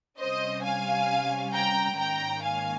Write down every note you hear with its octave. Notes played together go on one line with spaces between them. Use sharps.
C3 G3 C#4 C5 D#5
F5 G#5
G5 A#5
G#2 D#3 A#3 C#4 G5 A#5
F5 G#5